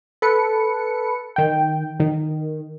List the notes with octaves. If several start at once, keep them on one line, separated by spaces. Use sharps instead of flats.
A4 B4 C#7
D#3 G5
D#3